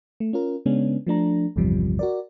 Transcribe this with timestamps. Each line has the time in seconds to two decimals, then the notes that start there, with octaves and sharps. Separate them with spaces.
0.20 A3
0.33 C#4 F4 A#4
0.66 C#3 G#3 B3 C#4 D4
1.07 F3 A3 D4 A#5
1.56 A1 E2 G2 C3 F3 G3
1.99 F#4 A#4 D5